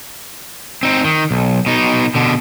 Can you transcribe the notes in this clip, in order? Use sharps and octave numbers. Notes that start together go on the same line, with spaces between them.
C4 D#4
D#3
B1
B2 D#4
B2 D3